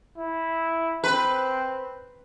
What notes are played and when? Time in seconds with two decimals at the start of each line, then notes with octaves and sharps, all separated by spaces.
0.17 E4
1.04 C4 B4